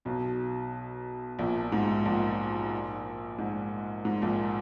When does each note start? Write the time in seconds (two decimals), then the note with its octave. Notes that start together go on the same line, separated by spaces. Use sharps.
0.05 B1 B2
1.39 A#1 A#2
1.72 G#2
2.05 A#1 A#2
3.38 G#2
4.05 G#2
4.22 A#1 A#2